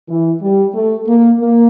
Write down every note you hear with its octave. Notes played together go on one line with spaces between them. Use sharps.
E3
G3
A3
A#3
A#3